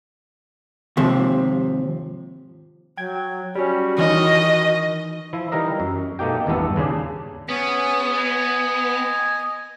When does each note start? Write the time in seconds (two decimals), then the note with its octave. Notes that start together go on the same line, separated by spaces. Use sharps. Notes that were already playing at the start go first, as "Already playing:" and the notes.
0.97 D#2 G#2 C3 F3
2.97 F#3 G5 G#6
3.55 G3 C#4 F#4
3.98 D#3 E3 D#4 D#5 C#6 F6
5.33 F3 E4
5.52 E3 G3 D#4 A#4 D#5
5.80 F#2
6.19 B2 A3 A#3 D#4 G4 G5
6.46 G#1 E2 G2 A3 B3 A4
6.76 D#2 C#3 D4 G#4
7.49 B3 C#4 G#4
8.16 D#5 G#5